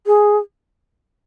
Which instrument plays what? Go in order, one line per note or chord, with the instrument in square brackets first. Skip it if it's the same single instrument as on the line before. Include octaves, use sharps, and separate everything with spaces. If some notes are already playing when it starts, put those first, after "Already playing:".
[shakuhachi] G#4